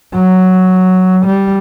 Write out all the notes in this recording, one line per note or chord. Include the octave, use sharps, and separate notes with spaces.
F#3
G3